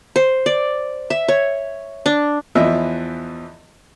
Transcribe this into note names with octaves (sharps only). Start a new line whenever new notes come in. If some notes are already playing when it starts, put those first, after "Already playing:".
C5
D5
E5
C#5
D4
E2 E3 F3 D#5 E5